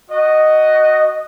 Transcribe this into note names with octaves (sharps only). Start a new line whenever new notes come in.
F#4 D#5